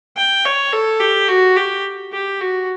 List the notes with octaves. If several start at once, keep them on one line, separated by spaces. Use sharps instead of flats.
G5
C#5
A4
G4
F#4
G4
G4
F#4